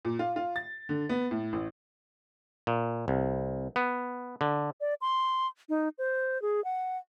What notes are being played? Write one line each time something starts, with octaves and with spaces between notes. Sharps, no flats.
A#2
F4
F4
A6
D3
B3
A2
A1
A#2
C2
B3
D3
D5
C6
D#4
C5
G#4
F#5